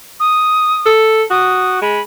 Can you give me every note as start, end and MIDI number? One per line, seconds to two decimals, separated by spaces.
0.20 0.90 87
0.86 1.23 69
1.30 1.81 66
1.30 1.78 87
1.82 2.00 56
1.82 2.01 83